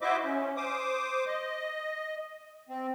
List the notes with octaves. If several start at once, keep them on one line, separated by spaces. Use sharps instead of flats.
E4 F#4 C5 D#5 E5 D6
C#4
C5 D6 D#6
D#5
C4